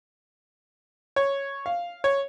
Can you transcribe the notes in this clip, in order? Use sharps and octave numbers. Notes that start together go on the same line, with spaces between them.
C#5
F5
C#5